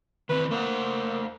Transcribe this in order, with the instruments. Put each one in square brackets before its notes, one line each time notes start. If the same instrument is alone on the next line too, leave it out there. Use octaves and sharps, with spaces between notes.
[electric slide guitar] D#3 E3 C4 [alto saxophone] B4
[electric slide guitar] A3 C5 F#5 [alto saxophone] A#3